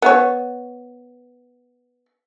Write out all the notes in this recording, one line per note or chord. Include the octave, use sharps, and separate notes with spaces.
B3 C#5